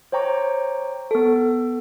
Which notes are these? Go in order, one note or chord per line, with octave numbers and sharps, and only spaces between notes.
C5 C#5 G5 A#5 C#6 D6
B3 A4